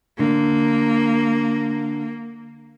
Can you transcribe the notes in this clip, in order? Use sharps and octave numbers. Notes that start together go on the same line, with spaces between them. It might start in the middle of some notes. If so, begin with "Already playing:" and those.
D3 A#3